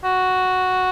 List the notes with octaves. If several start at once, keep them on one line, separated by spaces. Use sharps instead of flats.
F#4